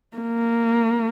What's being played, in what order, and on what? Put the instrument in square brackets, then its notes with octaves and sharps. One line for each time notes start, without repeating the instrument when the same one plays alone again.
[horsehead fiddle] A#3